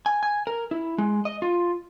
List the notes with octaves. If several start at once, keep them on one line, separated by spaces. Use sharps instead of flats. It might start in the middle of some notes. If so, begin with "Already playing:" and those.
G#5
G#5
A#4
E4
G#3
D#5
F4